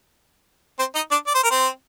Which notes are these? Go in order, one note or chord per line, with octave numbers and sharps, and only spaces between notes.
C4 C5
D#4 D#5
D4 D5
D5
C5
A#4
C4 C5